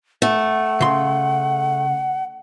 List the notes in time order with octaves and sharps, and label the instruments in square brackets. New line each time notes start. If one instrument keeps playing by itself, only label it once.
[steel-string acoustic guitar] A3 [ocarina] F#5
[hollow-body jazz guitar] C#3 C6